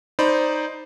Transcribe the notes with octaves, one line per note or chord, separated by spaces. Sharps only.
D#4 C5 D5 B5